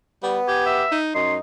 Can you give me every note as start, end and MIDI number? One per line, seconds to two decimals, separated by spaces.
0.23 0.39 55
0.23 0.87 59
0.48 0.84 67
0.48 0.65 80
0.66 0.97 76
0.92 1.13 63
1.15 1.37 42
1.15 1.40 63
1.15 1.34 84